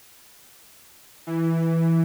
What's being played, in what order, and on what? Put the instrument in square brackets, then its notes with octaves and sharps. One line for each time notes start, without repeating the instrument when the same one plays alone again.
[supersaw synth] E3